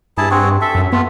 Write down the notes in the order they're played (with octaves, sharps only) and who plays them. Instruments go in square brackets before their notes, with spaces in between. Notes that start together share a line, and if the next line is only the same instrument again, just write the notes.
[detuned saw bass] G2 [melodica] E4 G#4 A5
[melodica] C4 F#4 G#4
A4 E5
[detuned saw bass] F#2
[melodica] A3 F4 [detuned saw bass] B3